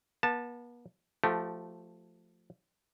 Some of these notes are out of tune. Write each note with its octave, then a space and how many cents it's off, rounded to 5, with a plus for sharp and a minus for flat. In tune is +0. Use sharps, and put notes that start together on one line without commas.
B3 -40 A5 +0
F3 +0 A3 +0 G4 -35